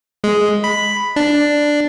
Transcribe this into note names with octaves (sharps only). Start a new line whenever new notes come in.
G#3
B5
D4